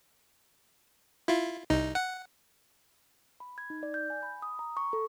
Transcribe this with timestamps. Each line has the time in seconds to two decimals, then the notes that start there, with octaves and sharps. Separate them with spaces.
1.28 E4 F4
1.70 C2 D#4
1.95 F#5
3.40 B5
3.58 G#6
3.70 D#4
3.83 D5
3.94 G6
4.10 G#5
4.23 B5
4.42 D#6
4.59 A#5
4.77 C#6
4.93 A4